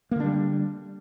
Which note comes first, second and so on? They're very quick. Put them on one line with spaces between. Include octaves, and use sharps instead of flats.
A#3 D3 D4 G3